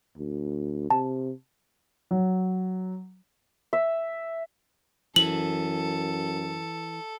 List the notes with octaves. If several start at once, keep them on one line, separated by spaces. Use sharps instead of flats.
D2
C3 A5
F#3
E5
F#2 E3 A4 F#7